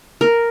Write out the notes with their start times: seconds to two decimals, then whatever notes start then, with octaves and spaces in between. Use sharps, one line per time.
0.21 A#4